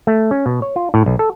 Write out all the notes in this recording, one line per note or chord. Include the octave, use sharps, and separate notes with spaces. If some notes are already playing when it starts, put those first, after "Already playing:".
A3
C#4
B2
C#5
F4
A2
B1
A4